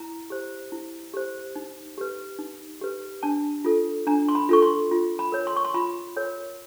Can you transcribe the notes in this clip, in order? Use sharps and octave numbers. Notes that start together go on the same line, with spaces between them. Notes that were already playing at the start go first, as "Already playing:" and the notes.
Already playing: E4 A#5
G4 C5
E4
G4 C5
D#4
G4 B4
D#4
G4 B4
D4 A5
F4 A4
D4 A#5
C6
B5
F4 A4 C#6
C6
F4
B5
A#4 C#5
C6
C#6
C6
F4 B5
A#4 C#5